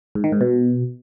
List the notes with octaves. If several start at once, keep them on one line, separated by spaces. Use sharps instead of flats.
G#2
D#3
G#2
B2